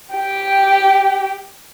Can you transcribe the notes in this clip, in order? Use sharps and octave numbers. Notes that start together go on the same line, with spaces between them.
G4 G5